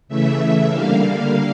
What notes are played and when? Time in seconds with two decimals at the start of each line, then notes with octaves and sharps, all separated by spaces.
0.08 C#3 E3 A3 E5
0.69 D3 G3 A#3 F5